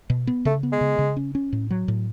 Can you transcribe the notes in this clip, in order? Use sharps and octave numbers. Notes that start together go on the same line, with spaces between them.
B2
B3
C#3 A3
B3
G#3
C#3
C#3
C#4
C#4
A2
F#3
A2